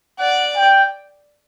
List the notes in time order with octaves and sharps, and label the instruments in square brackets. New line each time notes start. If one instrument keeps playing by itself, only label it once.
[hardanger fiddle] D5 [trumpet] F#5
[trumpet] G5